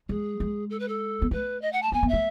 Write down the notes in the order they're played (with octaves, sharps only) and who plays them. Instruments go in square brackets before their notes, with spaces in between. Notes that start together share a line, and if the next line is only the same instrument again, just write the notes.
[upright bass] G#3 [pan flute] G#4
[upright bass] G#3
[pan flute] A4
B4
A4
[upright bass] B3
[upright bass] A3 [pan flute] B4
[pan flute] D#5
F#5
A5
[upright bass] B3 [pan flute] G#5
[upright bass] B3
[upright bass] A3 [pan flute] E5